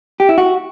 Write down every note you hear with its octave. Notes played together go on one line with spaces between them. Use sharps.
G4
E4
F#4